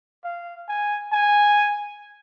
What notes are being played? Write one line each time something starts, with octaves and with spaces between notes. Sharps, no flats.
F5
G#5
G#5